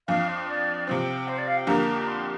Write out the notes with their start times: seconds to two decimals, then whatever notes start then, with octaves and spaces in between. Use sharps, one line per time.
0.07 F2 F3 D4 F5
0.28 C5
0.48 D5
0.87 C3 F3 C4 G5
1.28 C5
1.38 D5
1.47 F5
1.57 G5
1.67 F2 D3 A#3 D4 G4 A#5
1.99 A#5
2.07 C6